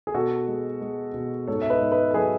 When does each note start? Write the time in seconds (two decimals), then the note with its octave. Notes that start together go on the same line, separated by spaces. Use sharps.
0.07 G#4
0.14 B2 F#4 A4
0.48 G#3
0.81 G#3
1.14 B2
1.48 G#2 A4 C#5
1.62 E5
1.70 B4 D#5
1.81 G#2
1.92 B4 D#5
2.11 A4
2.14 F#3 G#4 B4